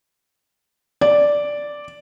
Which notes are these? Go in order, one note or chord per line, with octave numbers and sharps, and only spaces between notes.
D5